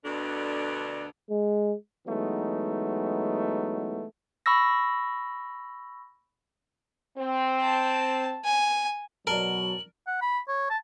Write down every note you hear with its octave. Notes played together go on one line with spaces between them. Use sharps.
D2 B2 D3 D4
G#3
E3 F#3 G#3 A3 B3 D#4
B5 C#6 E6 A#6
C4
A5
G#5
B2 F#3 A#4 D5 A5 F#7
F#5
B5
C#5
A5